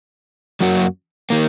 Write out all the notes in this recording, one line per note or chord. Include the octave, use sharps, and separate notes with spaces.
F#2 F#3 A#3 F#4
D#3 A#3